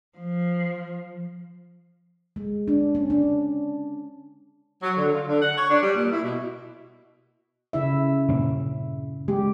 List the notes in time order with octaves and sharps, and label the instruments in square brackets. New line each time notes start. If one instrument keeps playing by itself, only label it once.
[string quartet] F3
[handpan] G#3
D4
C#4
D4
[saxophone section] F#3
D3
F4
D3
F#5
C#5
D4
G3
A#2
E4
B2
[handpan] C#3 E4 E5
[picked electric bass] G2 A#2 C#4
[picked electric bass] G#3 [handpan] G4